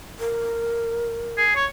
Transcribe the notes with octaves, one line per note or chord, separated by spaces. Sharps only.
A#4
G#4
C#5